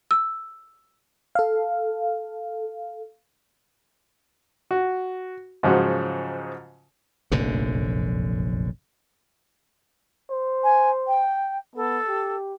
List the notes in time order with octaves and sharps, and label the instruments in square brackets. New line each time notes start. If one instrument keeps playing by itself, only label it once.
[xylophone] E6
[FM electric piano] A4 F5
[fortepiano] F#4
G#2 C#3 F3 F#3 F#5
[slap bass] F1 A#1 F#2 D3
[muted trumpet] C5
[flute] G#5
G5
[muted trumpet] B3 [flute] A4
[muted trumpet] G4